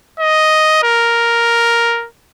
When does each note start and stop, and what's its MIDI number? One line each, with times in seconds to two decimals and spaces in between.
0.20 0.80 75
0.83 2.07 70